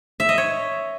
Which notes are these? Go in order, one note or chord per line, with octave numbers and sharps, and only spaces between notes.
E5
D#5
C#5